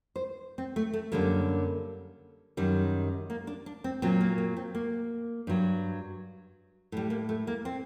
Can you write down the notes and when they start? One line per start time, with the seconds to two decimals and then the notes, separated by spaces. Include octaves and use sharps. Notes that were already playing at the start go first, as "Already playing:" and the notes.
0.16 C5
0.58 C4
0.76 A3
0.94 A3
1.12 F#2 D3 G3 A#3
2.57 F#2 D#3 G3
3.30 A#3
3.47 D4
3.66 D4
3.84 C4
4.02 A#2 F#3 C4
4.21 A#3
4.38 A#3
4.57 C4
4.75 A#3
5.47 G2 F#3
6.92 A2 G3
7.10 A#3
7.29 A3
7.47 A#3
7.65 C4